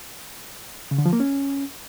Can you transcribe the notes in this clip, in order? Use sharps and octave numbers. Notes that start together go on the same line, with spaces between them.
C#3
D3
F3
A#3
C#4